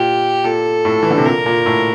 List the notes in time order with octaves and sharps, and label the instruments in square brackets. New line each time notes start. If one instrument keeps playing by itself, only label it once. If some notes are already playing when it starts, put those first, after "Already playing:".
Already playing: [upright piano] A#2 [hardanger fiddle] G4
[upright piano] A#2 [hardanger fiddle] A4
[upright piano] A2
E3
D3
C3
[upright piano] A#2 [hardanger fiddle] A#4
[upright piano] A#2
A2